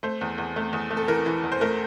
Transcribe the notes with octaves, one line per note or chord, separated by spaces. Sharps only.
A3 C5
E2
E2
A3
E2
A3
A4
E3 A#4
E3
E2
C5
A3 A#4